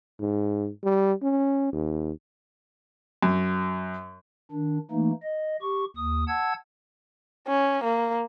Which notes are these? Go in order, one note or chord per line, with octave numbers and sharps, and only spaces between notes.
G#2
G3
C#4
D#2
F#2
D#3 D4
E3 A3 A#3 D#4
D#5
G4 C#6
D#2 D#6
F#5 A5 E6 G#6
C#4
A#3